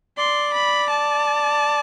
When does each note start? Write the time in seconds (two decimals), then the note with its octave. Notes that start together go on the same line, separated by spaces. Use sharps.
0.18 D5 C6
0.54 B5
0.90 A5